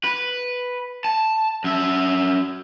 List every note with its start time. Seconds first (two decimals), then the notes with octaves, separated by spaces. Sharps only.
0.04 B4
1.05 A5
1.64 F#2 E5